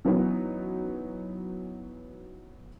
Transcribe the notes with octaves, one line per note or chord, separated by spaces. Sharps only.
E3 F#3 B3 C#4 D#4